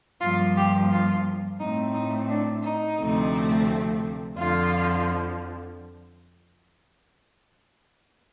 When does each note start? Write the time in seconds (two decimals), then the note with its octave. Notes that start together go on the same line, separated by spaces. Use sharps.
0.21 G2 F3 A#3 F4
0.57 G4
0.90 F4
1.60 A2 A3 C4 D#4
1.94 D#4
2.29 D4
2.63 D#4
2.99 D2 C3 F3 A3 C4
4.37 F2 D3 F3 F4